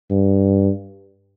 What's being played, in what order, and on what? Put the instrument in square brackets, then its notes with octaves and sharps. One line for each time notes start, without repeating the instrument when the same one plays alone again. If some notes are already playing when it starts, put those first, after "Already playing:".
[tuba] G2